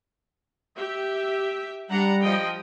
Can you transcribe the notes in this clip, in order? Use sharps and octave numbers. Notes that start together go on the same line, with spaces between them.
G4 E5
G3 D4 F#5 A#5
F3 D#5 G5